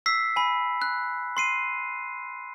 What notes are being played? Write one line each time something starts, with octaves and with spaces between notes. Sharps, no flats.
E6 B6 C7
G#5 B5
F#6
C6 C7 D#7